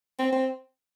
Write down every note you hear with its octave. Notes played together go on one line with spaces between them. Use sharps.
C4
C4